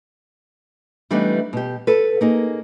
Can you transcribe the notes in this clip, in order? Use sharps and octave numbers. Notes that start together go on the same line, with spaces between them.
E3 G3 A3 B3 D4 D#4
B2 G4
A4 B4
A#3 D#4 G#4